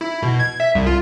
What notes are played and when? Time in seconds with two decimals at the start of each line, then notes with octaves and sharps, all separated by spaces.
0.01 E4
0.22 B2
0.39 G#6
0.60 E5
0.75 C2
0.87 F4